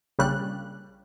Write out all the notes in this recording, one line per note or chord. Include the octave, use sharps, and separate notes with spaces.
A#1 C#3 G3 F#6